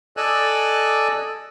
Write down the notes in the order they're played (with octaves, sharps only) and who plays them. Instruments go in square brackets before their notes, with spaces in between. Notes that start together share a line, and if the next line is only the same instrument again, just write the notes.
[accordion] A4 D5 D#5 G#5 E6 F#6